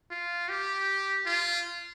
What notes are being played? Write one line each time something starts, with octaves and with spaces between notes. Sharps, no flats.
F4
G4
F4